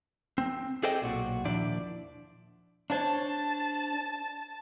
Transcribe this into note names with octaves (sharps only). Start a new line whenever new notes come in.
C4
G#4 A4 C5 D5 D#5 G5
B1 A#2 F#4
D#2 A#2 F3 D4 E4 D5
D4 C5 C#5 A5